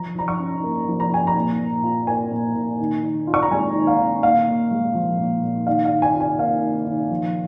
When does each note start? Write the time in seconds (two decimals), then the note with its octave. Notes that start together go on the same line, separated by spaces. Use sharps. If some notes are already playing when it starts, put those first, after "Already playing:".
Already playing: F3 A#5
0.15 F3 A#5
0.28 C#6
0.40 C#4
0.64 A#3
0.88 F3
1.00 A#5
1.12 F3 G#5
1.27 A#5
1.36 A#2
1.60 A#2
1.83 F4
2.07 A#3 G#5
2.31 A#2
2.56 A#2
2.79 D#3
3.03 D#3
3.27 F4
3.34 C#6
3.42 A#5
3.51 G#3 G#5
3.75 D#3
3.87 F5
3.99 D#3
4.23 A#2 F5
4.48 A#2
4.71 G#3
4.95 F3
5.18 A#2
5.43 A#2
5.67 D#3 F5
5.85 F5
5.91 D#3
6.02 G#5
6.14 F4
6.20 G#5
6.39 A#3 F5
6.63 D#3
6.87 D#3
7.10 F3